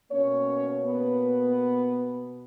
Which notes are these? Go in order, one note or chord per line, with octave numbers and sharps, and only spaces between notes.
B2 A#3 C#4 C#5
B3 B4